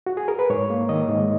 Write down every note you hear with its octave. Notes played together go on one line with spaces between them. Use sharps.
F#4
G#4
A#4
B4
G#2 C#5
A#3
D#3 D#5
G#2